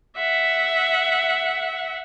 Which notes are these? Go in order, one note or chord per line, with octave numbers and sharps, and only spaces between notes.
E5 F#5